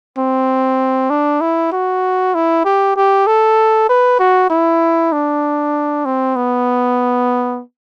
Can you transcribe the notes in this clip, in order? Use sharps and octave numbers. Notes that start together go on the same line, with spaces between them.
C4
D4
E4
F#4
E4
G4
G4
A4
B4
F#4
E4
D4
C4
B3